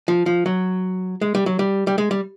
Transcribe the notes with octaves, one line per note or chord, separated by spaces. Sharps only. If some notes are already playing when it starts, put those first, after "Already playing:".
F3
F3
F#3
G#3
G3
F#3
G3
G3
G#3
G3